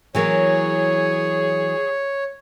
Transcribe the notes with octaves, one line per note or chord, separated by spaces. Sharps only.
E3 F#3 A#3 G#4 C#5